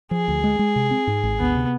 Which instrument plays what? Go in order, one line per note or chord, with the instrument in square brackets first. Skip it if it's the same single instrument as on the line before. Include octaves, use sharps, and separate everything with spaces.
[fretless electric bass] F3 [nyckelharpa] G#4
[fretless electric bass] D2
G#3
G#3
C3
C4
G#2
G#1
[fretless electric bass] D2 [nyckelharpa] B3
[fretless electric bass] C3